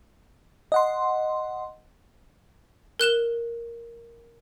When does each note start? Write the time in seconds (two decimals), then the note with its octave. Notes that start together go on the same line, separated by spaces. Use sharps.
0.72 D#5 F#5 C6
3.00 A#4 F#6 E7 G7